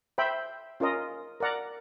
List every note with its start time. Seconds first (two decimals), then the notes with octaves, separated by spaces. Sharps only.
0.18 C5 E5 G5 B5
0.80 C#4 F4 A#4 D#5
1.40 A#4 D5 F#5 A#5